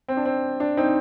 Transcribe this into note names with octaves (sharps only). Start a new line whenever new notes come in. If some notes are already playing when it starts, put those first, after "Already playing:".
C4
D4
C4
D4
C4 D#4